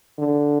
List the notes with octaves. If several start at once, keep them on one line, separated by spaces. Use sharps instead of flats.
D3